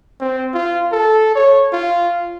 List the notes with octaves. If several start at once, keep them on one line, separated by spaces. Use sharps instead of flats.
C4
F4
A4
C#5
F4